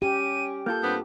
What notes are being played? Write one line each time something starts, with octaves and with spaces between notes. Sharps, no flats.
C#4 G4 D#7
A#3 F4 A4 G6
G2 B3 C4